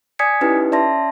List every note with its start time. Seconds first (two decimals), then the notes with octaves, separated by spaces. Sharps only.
0.19 D5 G#5 D#6 G#6 B6 C#7
0.41 C#4 D#4 E4 G4 B4
0.72 C#4 D5 E5 A5 C6 A#6